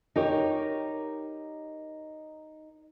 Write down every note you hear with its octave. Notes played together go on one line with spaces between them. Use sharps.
D#4 G4 A#4 C#5